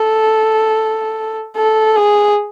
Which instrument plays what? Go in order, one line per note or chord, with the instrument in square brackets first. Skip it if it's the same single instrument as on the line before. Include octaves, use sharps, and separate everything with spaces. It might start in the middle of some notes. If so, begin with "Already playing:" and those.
Already playing: [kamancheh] A4
A4
G#4